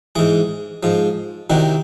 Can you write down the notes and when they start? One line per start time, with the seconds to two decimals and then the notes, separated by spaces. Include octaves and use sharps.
0.16 G#2 E3 G#4
0.83 G#2 F3
1.50 C2 C3 D#3 F#4